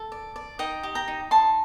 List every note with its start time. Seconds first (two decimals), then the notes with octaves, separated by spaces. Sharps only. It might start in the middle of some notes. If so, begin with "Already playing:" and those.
Already playing: A4
0.12 D5
0.36 D5
0.59 D#4 D#5 G5
0.83 G4
0.95 G5 A#5
1.08 D#4
1.31 D#4 A5 C6